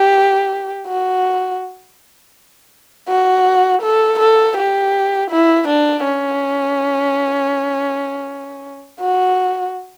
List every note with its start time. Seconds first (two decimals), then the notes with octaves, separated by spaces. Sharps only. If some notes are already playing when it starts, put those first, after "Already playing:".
Already playing: G4
0.87 F#4
3.08 F#4
3.82 A4
4.19 A4
4.57 G4
5.31 E4
5.68 D4
6.04 C#4
9.00 F#4